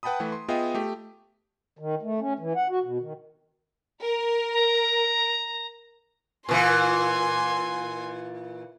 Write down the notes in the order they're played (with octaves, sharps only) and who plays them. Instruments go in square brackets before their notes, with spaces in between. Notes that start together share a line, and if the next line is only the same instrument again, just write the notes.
[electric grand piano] B4 F#5 G5 A5 B5 D#6
E3 A3 B4
C6
B3 F4 G#4 D#5 E5 G5
A3 G4
[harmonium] D#3
A3
C#4
E3
F#5
F#4
B2
D#3
[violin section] A#4
[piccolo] A#5
[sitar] A#2 E3 [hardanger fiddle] G#5 C6